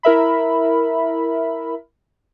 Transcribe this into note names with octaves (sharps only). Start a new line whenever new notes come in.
E4 A#4 E5 B5